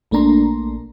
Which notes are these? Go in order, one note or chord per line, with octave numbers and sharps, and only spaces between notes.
A#1 A3 A#3 D4 A#5 C6